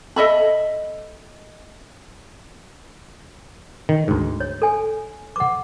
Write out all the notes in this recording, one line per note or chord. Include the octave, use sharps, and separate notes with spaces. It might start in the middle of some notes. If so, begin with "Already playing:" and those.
A4 D#5 E5 B5
D#3
D2 G#2
C#5
A4 G#5
F#5 D6